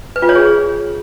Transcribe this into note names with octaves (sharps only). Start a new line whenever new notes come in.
B4
F4
C#5
G#4